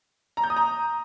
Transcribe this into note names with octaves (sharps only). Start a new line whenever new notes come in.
A#5
G6
D#6
A#5